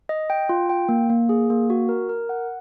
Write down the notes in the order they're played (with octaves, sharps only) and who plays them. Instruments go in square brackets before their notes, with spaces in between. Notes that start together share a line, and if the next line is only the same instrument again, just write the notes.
[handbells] D#5
G5
F4
G5
A#3
A#3
G#4
A#3
F#4
A#4
A#4
F#5